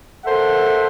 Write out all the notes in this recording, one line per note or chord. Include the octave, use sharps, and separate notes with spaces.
A4 A#4 C5 E5 F#5